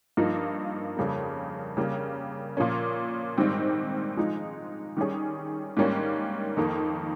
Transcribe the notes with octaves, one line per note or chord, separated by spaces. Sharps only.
G2 F3 A#3 D#4
F2 C#3 G3 A#3
C#3 G3 A#3
A#2 F3 A#3 C#4
G#2 D#3 G3 C4
F3 G#3 D#4
D#3 G3 C#4 G#4
G#2 G3 A#3 C#4
F2 D#3 A#3